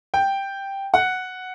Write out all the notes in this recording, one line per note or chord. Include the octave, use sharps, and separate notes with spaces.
G5
F#5